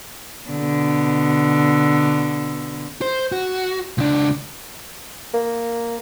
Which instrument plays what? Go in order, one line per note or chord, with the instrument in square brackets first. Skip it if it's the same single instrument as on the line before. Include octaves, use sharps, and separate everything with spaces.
[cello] B2 D3
[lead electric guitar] C5
F#4
C#2 D4
[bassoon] A#3